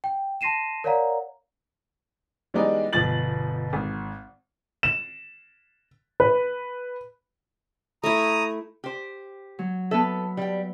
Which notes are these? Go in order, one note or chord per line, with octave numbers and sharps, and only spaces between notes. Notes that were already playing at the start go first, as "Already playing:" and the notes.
G5
A5 C6 A#6 C7 D#7 E7
A#4 C#5 D5 F5 F#5 A#5
E3 G3 G#3 B3 D4 D#4
G1 B2 F3 A6 F#7
G#1
E7
B4
A3 E4 A#5 D#6
G4 C5
F#3
B3 A4 B4 E5
G3 G5